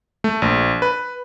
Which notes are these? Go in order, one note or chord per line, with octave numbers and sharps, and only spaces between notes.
A3
A#1
B4